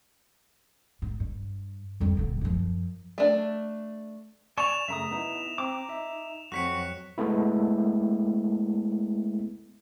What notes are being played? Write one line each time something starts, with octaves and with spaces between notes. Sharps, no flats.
G#2
G2
F2 G3
D#1 D3
F#2 F3
A3 D4
D5 G#5 C#6 E7 F7
F#2 C#3 A3 E5 A#5 D#6
B3 D#4 E4
C4 A#5 D6
D#4 E5
F2 F#3 C4 F#4 F#6 B6 C#7
G#3 A3 B3 E4